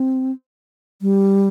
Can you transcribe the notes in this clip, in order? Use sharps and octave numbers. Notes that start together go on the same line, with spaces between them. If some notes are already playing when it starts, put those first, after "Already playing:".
Already playing: C4
G3